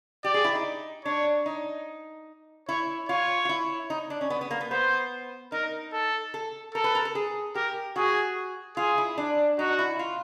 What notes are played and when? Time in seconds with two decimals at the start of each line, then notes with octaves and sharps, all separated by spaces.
0.24 G4 D5
0.34 G#4
0.44 E4
0.55 D#4
1.05 D4 C#5
1.46 D#4
2.68 E4 C#5
3.09 F4 C#5
3.45 F4
3.49 E4
3.90 D#4
4.10 D4
4.21 C#4
4.30 B3
4.41 B3
4.51 A#3
4.61 B3
4.71 B3 C5
5.52 D#4 A#4
5.92 A4
6.34 A4
6.74 A4 A#4
6.84 B4
6.95 A#4
7.05 A4
7.15 G#4
7.55 G4 A#4
7.96 F#4 G#4
8.77 F4 G#4
8.98 E4
9.18 D4
9.59 D#4 F#4
9.79 E4
9.99 F4